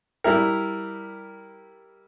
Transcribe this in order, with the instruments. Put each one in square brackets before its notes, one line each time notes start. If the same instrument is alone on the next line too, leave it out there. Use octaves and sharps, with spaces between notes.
[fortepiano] G3 E4 A#4